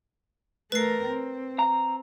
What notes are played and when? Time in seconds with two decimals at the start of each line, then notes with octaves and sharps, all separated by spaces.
0.72 A3 A#4 B4 C7
1.04 C4
1.59 A#5